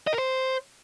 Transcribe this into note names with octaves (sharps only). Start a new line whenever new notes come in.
D#5
A#4
C5